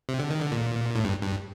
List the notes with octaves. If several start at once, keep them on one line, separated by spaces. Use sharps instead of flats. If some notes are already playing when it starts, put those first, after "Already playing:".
C3
D3
D#3
D3
A#2
A2
G2
G2